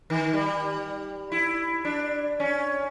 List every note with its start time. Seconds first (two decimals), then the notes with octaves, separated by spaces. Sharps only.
0.10 D#3
0.34 G3
1.32 E4
1.85 D4
2.40 C#4